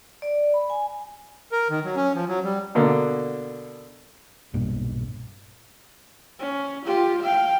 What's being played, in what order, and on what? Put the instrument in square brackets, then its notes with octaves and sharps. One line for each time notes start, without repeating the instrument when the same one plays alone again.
[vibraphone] D5
B5
G#5
[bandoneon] A#4
D#3
F#3
C#4
F3
F#3
G3
[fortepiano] B2 D3 A#3
[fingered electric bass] B1 G2 A#2
[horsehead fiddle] C#4
F4 G4
F5 G5